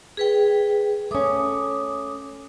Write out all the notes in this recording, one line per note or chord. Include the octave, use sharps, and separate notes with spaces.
G#4 B4 G5
A3 C#4 D6 D#6